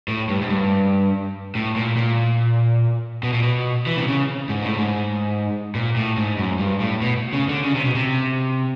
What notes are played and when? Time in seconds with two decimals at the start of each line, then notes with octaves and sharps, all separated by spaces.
0.08 A2
0.29 G2
0.42 G#2
0.50 G2
1.55 A2
1.76 A#2
1.97 A#2
3.23 B2
3.33 A#2
3.42 B2
3.86 E3
3.97 C3
4.07 C#3
4.49 G#2
4.63 A2
4.76 G#2
5.75 A#2
5.96 A2
6.17 G#2
6.38 F#2
6.59 G2
6.80 A2
7.01 B2
7.33 C#3
7.48 D3
7.64 C#3
7.74 C3
7.85 B2
7.95 C3